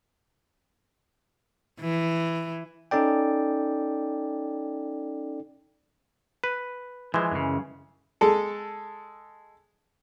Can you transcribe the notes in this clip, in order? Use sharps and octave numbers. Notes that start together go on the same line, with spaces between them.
E3
C#4 D#4 A4 D5 G5
B4
E3 F3 G#3
F#2 C#3
G#3 A4